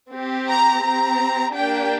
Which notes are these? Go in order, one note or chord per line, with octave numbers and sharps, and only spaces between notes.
C4 G4
A#5
C4 G4 A#5
A#3 D4 G4 G5